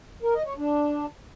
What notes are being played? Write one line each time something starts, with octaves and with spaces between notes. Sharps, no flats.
A#4
D#5
C#5
D4